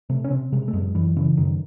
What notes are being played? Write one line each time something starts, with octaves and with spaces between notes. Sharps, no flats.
C3 A3
C#4
C3 C4
C3 G#3
A3
F#2 G#3
F#2 E3
C#3 E3
F#2 D#3